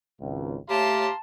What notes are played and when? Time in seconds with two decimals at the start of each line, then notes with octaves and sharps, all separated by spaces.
0.21 G#1 C#2
0.70 A3 G4 C#5 E5 F5 A5 A#5 C6